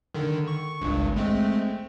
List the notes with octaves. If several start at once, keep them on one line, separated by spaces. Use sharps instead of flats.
D3 D#3
C#6
G#1 C#2 G2
G#3 A3 C4